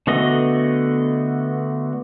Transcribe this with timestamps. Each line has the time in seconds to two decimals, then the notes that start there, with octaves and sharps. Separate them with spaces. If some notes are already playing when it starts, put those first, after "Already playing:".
0.07 D3 A3 B3 F#4 D#5